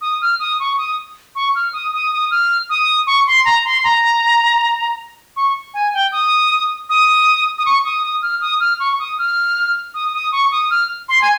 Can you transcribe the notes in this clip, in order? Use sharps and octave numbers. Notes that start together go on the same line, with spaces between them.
D#6
F6
D#6
C#6
D#6
C#6
F6
D#6
D#6
D#6
F6
D#6
C#6
C6
A#5
C6
A#5
C#6
G#5
G5
D#6
D#6
D#6
C#6
D#6
D#6
F6
D#6
F6
C#6
D#6
F6
D#6
D#6
C#6
D#6
F6
C6
G#5